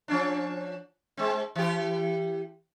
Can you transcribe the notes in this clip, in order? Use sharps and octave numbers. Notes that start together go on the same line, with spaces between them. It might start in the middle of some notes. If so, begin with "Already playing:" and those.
F3 C#4 D4
G#3 C4
E3 G4